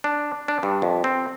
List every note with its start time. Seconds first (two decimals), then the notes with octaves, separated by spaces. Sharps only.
0.04 D4
0.48 D4
0.63 G2
0.82 F2
1.04 C4